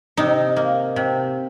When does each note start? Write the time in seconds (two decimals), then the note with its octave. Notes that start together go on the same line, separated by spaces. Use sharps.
0.17 C3 D#4
0.56 A#3
0.96 C3